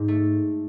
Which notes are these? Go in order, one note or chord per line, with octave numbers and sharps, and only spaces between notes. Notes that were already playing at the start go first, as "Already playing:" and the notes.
Already playing: G#2
A3